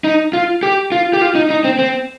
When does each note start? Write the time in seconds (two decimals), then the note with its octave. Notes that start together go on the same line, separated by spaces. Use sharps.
0.04 D#4
0.33 F4
0.63 G4
0.92 F4
1.13 G4
1.22 F4
1.35 D#4
1.50 D#4
1.64 C4
1.79 C4